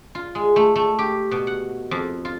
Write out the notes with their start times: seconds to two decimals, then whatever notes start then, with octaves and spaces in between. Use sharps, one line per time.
0.15 F4
0.35 G#3
0.56 A3
0.76 A3
0.99 G4
1.31 B2
1.47 F#5
1.91 F2
2.25 F4